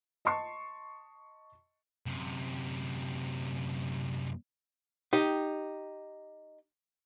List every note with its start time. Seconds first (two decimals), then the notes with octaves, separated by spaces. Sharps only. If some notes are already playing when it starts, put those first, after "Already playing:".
0.25 D#5 A5 C6 C#6 C7
2.06 F#2 C3
5.13 D#4 G4